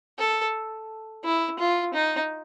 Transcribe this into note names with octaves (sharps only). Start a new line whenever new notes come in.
A4
E4
F4
D#4